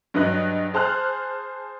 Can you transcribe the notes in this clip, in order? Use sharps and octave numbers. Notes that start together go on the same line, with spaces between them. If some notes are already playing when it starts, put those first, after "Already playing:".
G2 F#3 B4 D#5 F#6
G#4 C5 A5 F6 F#6